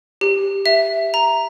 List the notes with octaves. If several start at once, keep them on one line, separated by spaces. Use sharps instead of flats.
G4
E5
A#5